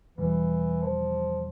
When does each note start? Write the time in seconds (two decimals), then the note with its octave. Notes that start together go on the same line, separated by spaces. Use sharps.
0.17 E2 B2 E3 G3
0.82 F3